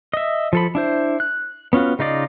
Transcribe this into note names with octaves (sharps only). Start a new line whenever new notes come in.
D#5 E5
F3 A4 B5
D4 E4 C5
F#6
B3 C#4 F4 F#4
C#3 D#4 F4 D5 D#5